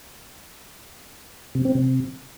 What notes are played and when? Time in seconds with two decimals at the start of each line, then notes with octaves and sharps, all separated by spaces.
1.55 C3
1.65 C4
1.75 C3